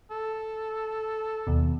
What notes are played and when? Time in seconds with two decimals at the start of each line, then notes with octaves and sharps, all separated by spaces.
0.11 A4
1.47 D#2 B2